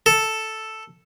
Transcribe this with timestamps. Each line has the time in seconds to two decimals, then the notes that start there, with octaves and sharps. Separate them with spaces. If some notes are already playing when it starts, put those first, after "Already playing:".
0.06 A4